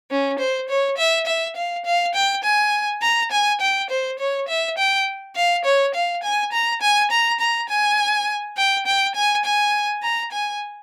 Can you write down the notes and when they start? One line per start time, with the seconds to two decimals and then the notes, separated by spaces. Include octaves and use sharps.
0.11 C#4
0.39 C5
0.69 C#5
0.98 E5
1.27 E5
1.56 F5
1.85 F5
2.14 G5
2.43 G#5
3.02 A#5
3.31 G#5
3.61 G5
3.90 C5
4.19 C#5
4.48 E5
4.78 G5
5.36 F5
5.65 C#5
5.94 F5
6.23 G#5
6.52 A#5
6.82 G#5
7.11 A#5
7.40 A#5
7.69 G#5
8.57 G5
8.86 G5
9.15 G#5
9.45 G#5
10.03 A#5
10.32 G#5